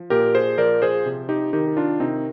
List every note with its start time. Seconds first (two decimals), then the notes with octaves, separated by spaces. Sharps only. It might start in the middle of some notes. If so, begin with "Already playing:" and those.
Already playing: F3
0.10 A#2 G4 A#4
0.35 G#4 C5
0.58 F3 A#4 D5
0.82 G#4 C5
1.06 C3
1.29 D#4 G4
1.53 D#3 D#4 G4
1.67 G4
1.77 D4 F4
2.00 C3 C4 D#4